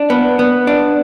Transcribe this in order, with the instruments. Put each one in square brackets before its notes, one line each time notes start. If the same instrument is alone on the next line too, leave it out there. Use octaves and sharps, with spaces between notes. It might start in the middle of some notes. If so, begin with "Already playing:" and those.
Already playing: [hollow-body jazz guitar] D4
B3
B3
D4